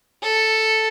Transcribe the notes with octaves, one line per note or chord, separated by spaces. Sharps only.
A4